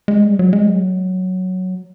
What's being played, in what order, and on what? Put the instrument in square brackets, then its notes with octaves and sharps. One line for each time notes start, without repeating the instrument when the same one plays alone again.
[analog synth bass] G#3
G3
F#3
G#3
F#3